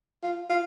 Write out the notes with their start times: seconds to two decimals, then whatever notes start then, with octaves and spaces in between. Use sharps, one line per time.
0.23 F4
0.49 F4